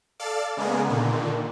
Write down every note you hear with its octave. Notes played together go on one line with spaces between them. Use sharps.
A4 D5 F5 A6
C#3 G#3 A#3 B3 G#4
A#2 D3 D#3